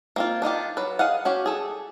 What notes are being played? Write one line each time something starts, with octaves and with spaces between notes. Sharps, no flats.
A#3 C4 F4
D4 D#4 F4 G4
F#3 B4
G#4 D#5 F5 F#5
C#4 F#4 G4
G#4 A4